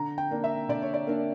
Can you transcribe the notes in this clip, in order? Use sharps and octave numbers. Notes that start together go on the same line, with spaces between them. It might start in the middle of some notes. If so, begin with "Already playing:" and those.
Already playing: D3 A#5
G5
A#3 D4
E5
D3 D5
C#5
D5
A#3 D4